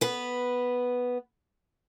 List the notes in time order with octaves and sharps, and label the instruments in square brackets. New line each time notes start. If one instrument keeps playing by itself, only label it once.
[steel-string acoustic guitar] B3 B4